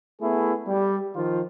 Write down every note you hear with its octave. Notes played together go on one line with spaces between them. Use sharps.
A3 B3 E4 G#4
G3
D#3 F3 F4